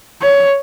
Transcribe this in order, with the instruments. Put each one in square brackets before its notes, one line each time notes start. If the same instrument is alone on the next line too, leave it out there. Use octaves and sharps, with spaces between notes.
[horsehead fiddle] C#5